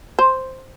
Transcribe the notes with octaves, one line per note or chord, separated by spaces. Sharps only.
C5